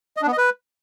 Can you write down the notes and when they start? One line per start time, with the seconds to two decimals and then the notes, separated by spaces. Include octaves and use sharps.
0.17 D#5
0.22 D4
0.27 B3
0.32 D#5
0.38 B4